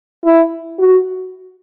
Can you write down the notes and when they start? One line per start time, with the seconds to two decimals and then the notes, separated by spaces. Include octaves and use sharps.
0.25 E4
0.79 F#4